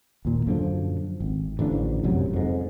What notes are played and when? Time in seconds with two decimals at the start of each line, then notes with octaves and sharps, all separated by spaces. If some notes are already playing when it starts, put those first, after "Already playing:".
0.25 D#2 A#2
0.47 F#2 D3 F3
1.20 G#1
1.59 A1 D3 F3 D4
2.03 F1 F#2 C3 F#3
2.33 F2 G#2